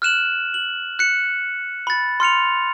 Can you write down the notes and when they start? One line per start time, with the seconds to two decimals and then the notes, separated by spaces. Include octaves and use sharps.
0.02 F6 F#6 E7 F#7
0.54 F#7
0.99 F#6 C#7
1.87 B5 A6
2.20 C6 F6 C#7 F7